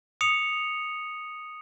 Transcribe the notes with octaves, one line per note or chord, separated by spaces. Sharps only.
D#6 C#7 F7